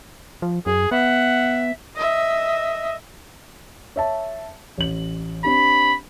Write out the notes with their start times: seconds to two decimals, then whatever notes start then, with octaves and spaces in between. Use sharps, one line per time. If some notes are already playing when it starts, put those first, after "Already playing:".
0.42 F3
0.66 F#2 G#4
0.91 B3 E5 F#5
1.96 D#5 E5
3.96 C#5 E5 A5
4.78 A1 F#7
5.45 C4 D4 G4 B5